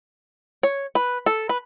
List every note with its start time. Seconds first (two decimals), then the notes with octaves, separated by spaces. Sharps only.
0.63 C#5
0.95 B4
1.26 A4
1.49 B4